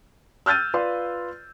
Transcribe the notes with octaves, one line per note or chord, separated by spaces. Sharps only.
E6 F6 G6 A6 D#7
F4 B4 D5 F5 C6